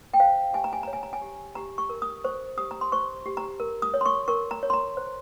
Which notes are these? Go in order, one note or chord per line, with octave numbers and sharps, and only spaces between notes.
G5
C5 F5
G4 G#5
A#5
G#5
C#5 A#5
G#5
A#5
G#5
G4
G4 A#5
C#6
A#4
D#6
C5 C#6
G4 D#6
A#5
C6
C5 C#6
G4
A#5
A#4
D#6
C#5
C6
C#6
A#4 C#6
A#5
C#5
C6
A#5
C5